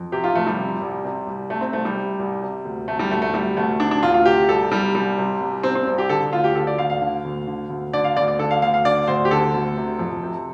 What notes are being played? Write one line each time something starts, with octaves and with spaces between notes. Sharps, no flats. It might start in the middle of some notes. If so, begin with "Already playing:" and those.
Already playing: F2
C3 G4
F4
F2 A3
G3
C3
C2
C3
C2
C3 A3
C4
C2 A3
G3
C3
C2
C3
D2
C3 A3
G3
D2 A3
A3
C3 G3
D2 A3
C3 D4
D4
D2 F4
F4
C3 G4
C2 A4
C3 G3
C2 G3
C3
C2
C3 C4
C4
C2
G4
D3 A4
D2 F4
G4
D3 A4
D5
D2 F5
F5
D3
D2
D3
D2
D3 D5
F5
D2 D5
D5
D3 A4
F5
D2 F5
F5
D3 D5
D2 C5
G4
D3 A4
D2
C3
F2
C3